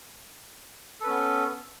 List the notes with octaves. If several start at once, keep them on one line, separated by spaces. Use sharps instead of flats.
B3 C#4 A4 B4